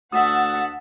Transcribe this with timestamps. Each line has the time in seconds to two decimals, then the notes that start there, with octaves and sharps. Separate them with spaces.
0.12 D2 E5 F#5 A5 D#6